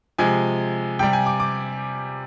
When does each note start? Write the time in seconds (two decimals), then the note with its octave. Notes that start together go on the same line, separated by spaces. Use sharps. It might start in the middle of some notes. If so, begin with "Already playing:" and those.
0.18 C3 F3 G#3 G#5
0.99 C3 G3 G5
1.13 G#5
1.26 D6
1.40 D6